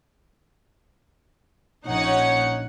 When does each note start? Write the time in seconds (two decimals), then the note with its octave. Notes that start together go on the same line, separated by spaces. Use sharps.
1.86 A#1 C#4 D#4 C#5 F#5